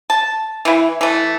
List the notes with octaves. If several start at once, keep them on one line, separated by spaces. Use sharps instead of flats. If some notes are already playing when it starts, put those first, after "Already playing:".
A5
E3 E4
E3 A3